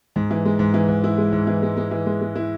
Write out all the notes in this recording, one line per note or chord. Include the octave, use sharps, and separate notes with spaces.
G#2
E3
G#3
G#2
E3
G#2
E4
G#3
G#2
E3
G#3
G#3
E3
G#3
G#3
E4